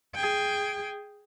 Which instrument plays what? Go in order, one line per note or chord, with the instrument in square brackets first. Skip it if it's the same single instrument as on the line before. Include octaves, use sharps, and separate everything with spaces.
[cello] G#4 G5